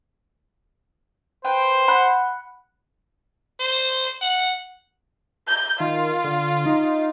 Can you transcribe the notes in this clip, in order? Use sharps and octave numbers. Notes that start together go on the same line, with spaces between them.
B4 C5 G5
F#5 B5 F#6
C5
F#5
G6
D#3 F4
D3
D#4